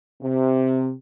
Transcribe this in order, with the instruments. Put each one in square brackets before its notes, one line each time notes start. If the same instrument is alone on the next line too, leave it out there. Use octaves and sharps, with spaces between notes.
[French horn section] C3